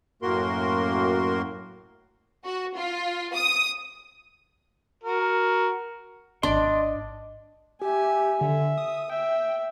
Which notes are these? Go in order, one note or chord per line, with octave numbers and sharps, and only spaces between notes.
F#2 A2 A#3 F#4 A#4 C6
F#4
F4
D#6
F#4 A#4
D1 G#1 D4 D5 D#5 C6
G4 E5 G#5
D3 E5
D#6
E5 G5